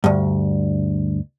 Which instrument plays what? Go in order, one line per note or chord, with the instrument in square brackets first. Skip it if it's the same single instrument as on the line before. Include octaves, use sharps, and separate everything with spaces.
[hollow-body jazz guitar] D2 G2